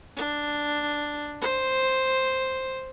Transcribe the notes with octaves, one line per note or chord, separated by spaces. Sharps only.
D4
C5